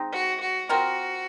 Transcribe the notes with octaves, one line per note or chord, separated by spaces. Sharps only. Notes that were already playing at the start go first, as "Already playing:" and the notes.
Already playing: G#3 C4 D#4
F#4
F#4
C4 F4 F#4 A#4